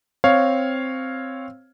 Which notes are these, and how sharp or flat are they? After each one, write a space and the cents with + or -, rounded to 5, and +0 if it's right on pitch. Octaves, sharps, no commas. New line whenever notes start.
C4 +0 C#5 +0 F5 +0